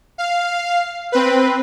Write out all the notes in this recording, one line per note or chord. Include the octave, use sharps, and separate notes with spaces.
F5
C4 B4